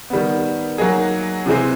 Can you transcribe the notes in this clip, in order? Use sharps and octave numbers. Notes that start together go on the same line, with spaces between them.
D#3 G3 B3
F#3 A#3 D#4 G#4
C3 E3 G#3 C4